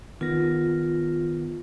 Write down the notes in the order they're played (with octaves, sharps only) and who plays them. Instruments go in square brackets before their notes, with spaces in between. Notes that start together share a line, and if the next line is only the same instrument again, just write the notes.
[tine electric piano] D#3 B3 A#6 [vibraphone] F4